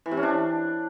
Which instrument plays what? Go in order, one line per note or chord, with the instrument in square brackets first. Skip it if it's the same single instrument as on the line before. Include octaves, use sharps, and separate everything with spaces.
[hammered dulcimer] E3
C3
C#4
D4